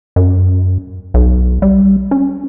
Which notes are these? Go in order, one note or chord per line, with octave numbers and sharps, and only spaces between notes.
F#2
B1
G3
C#4